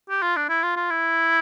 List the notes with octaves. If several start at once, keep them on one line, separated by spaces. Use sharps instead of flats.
G4
F4
D4
E4
F4
F4
E4